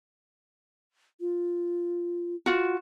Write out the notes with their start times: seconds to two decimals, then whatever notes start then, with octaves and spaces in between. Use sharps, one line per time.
1.20 F4
2.46 F4 F#4